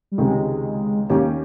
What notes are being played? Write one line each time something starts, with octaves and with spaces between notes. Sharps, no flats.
G3
C#2 C3 D#3 G#3
D#2 D#3 G3 A#3 C#4 G4